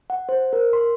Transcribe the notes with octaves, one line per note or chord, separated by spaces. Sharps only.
F#5
C5
A#4
C6